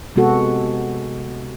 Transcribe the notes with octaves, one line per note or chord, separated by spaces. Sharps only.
C3 G#3 B3 F#4 A4